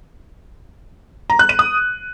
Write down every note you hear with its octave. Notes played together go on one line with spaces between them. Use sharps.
A#5
F#6
D#7
D#6